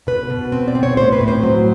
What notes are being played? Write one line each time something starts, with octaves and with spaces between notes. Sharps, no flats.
B2 B4
B2
C4
D5
C4
C#5
A2 C5
B4
A2
C5
F#3